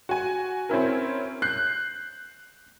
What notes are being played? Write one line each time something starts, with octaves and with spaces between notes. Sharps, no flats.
F#4 G#5
C4 C#4 E4 A#4
F#6 G6 C7